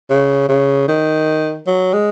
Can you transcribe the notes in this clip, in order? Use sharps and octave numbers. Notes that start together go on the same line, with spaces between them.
C#3
C#3
D#3
F#3
G#3